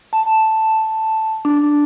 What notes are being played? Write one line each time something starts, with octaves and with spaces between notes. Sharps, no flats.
A5
D4